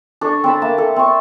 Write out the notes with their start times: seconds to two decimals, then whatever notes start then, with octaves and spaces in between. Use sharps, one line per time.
0.21 D4 A4 C#6
0.44 C4 A5 B5
0.62 A#3 E5 A5
0.78 A4
0.96 C4 C#6